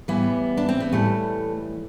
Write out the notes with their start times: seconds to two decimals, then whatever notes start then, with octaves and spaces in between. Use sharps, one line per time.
0.08 A2 E3 G3 B3
0.57 D4
0.69 C4
0.80 B3
0.92 A2 E3 G3 A3